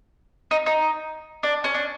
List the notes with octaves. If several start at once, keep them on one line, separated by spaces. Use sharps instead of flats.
D#4
D#4
D4
C#4
D4